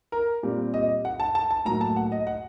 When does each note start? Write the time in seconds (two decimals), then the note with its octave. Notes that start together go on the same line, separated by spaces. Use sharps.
0.12 A#4
0.43 A#2 G3 C4
0.74 D#5
1.05 F#5
1.20 A5
1.35 A5
1.51 A5
1.65 A2 F#3 A#3 A#5
1.81 A5
1.96 F#5
2.12 D#5
2.27 F#5